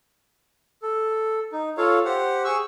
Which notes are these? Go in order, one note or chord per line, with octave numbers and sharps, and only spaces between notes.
A4
D#4
F4 A4 C#5 F5
G4 C5 F#5
G#4 C#6 E6